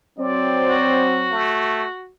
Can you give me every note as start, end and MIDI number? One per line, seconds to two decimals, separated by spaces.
0.19 1.41 54
0.19 1.41 60
0.19 1.09 74
0.69 2.10 66
1.31 1.86 57